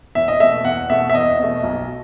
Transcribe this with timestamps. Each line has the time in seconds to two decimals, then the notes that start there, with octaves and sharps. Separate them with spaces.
0.15 E2 E5
0.28 D#5
0.40 B2 A3 E5
0.65 E2 F#5
0.90 B2 A3 E5
1.10 E5
1.14 E2 D#5
1.39 B2 A3
1.64 B1